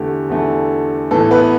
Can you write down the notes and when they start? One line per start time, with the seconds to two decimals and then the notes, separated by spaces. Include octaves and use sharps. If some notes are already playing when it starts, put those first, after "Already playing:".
Already playing: E2 D3 A3 G4
0.29 E2 D3 A3
1.11 A2 E3 B3 A4
1.31 B3 B4